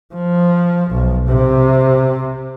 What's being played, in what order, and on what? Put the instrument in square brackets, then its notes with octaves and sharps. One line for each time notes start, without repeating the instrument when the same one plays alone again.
[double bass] F3
B1
C3